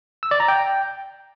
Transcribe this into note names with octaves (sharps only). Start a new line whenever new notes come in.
E6
D5
A#5
G5